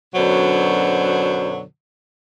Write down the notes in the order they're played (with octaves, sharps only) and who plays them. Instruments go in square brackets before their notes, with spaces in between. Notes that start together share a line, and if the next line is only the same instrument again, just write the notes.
[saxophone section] F#2 B2 D3 F#3 D4 C5